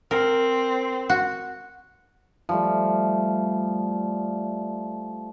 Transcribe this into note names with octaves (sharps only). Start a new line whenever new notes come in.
C4 A#4
F#4
F3 G3 A3